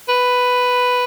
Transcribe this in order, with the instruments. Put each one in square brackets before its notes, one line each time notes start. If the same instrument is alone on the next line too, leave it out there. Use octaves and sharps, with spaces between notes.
[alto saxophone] B4